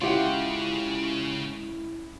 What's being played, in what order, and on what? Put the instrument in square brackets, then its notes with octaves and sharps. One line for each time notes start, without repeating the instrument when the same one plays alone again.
[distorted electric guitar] C#3 [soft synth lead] G#3 [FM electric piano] C#4 E4 [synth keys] F4 G4 F#5